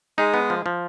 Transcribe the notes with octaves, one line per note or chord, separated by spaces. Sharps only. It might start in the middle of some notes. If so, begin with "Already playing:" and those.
G#3 D#4
B3
F3
F3